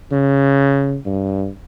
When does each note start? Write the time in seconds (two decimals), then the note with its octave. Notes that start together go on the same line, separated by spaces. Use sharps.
0.12 C#3
1.06 G2